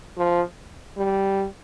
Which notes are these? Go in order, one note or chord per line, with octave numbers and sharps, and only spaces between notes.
F3
G3